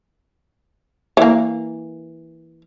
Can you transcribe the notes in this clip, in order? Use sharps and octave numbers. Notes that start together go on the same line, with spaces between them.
E3 A#3